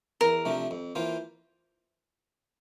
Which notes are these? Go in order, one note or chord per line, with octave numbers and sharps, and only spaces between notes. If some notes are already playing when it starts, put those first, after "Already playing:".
E2 A#4
C3 F3 A3 D4
F2
E3 A#3 F4 C5